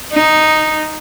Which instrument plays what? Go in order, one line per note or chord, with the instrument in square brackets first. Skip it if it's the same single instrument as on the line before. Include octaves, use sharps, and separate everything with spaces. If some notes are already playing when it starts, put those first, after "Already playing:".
[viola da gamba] D#4